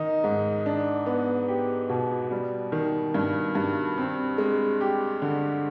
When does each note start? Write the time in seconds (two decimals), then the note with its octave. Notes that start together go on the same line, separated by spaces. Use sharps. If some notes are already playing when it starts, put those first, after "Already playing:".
Already playing: D#3 D#4
0.24 G#2
0.66 D4
1.06 B3
1.48 G4
1.89 B2
2.31 G3
2.72 D#3
3.14 G2
3.55 G2
3.98 C4
4.38 G#3
4.81 G4
5.22 D3